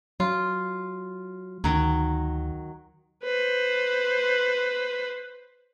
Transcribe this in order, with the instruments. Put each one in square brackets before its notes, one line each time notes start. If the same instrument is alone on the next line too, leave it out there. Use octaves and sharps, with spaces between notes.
[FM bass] F#3 [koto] F4
[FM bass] D2 [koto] D#3 F#3
[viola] B4 C5